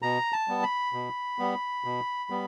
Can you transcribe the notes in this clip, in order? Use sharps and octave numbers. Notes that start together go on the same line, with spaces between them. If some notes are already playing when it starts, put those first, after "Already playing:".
B2 A#5
A5
G3 B3
B5
B2
G3 B3
B2
G3 B3